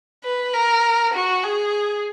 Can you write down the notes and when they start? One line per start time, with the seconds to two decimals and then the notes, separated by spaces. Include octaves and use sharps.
0.24 B4
0.54 A#4
1.13 F#4
1.44 G#4